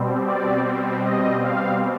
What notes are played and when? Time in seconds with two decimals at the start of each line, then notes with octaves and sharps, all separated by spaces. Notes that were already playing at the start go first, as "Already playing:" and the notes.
Already playing: B2 G3 C4
0.28 D5
1.04 D#5
1.43 F5